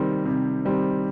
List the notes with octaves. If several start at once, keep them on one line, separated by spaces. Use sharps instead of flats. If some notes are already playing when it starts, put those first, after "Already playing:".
Already playing: C3 D#3 G3 C4
C3
D#3 G3 C4